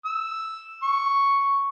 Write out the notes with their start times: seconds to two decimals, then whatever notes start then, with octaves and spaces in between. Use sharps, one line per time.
0.05 E6
0.83 C#6